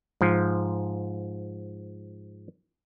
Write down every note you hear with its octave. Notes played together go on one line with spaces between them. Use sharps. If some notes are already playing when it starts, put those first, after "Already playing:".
G#2 F3